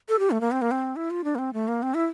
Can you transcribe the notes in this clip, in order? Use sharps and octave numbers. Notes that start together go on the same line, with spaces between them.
A4
G4
A3
A#3
C4
A#3
C4
E4
F4
D4
A#3
C4
A3
A#3
C4
E4